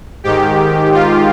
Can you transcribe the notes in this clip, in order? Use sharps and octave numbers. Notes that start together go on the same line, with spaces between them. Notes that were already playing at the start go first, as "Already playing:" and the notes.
G#2 D#3 G4
F4